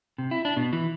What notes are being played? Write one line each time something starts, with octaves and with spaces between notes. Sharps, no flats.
C3
E4
D4
B2
E3